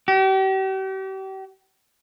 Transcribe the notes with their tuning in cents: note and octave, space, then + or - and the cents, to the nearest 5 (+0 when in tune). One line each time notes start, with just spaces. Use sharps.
G4 -40